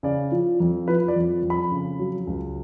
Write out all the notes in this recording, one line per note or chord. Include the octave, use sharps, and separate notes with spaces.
C#3 D5
F3
F2
F3 B4
D5
F2
F2
B5
C#3
F#3
C#2